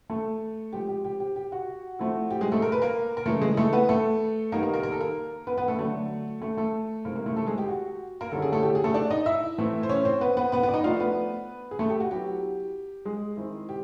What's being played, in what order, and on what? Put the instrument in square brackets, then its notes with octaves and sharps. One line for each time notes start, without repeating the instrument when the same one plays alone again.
[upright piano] A3 A4
F3 G#3 C4 G4
G4
G4
G4
G4
F#4
F3 A3 C4 E4
G4
G#3 G#4
A3 A4
A#4
B4
A#3 A#4
A#4
C#3 E3 G#3 A3 A4
G#3 G#4
A3 A4
B3 B4
A3 A4
D#3 G3 A#3 B3 D#4 A#4
A#3 A#4
A#3 A#4
A#4
A4
A#3 A#4
B3 B4
B3 B4
A3 A4
D3 F#3 A3 B3 D4 A4
A3 A4
A3 A4
C3 D#3 G#3 A#3 C4 E4 A#4
A#3 A#4
A3 A4
A3 A4
G#3 G#4
G4
F#4
A#3 A#4
D3 G3 A#3 C#4 E4 A4
G#4
A3 A4
G4
G#4
A3 A4
D4 D5
D#4 D#5
E4 E5
A2 E3 A3 C4 E4
C5
C#4 C#5
C4 C5
B3 B4
B3 B4
B3 B4
B3 B4
D5
D#4 D#5
F3 A3 D4 F4 F5
B3 B4
G#4
A3 A4
G4
F#4
F#3 B3 E4 G4
G#3 G#4
D#3 G#3 C4 E4
G4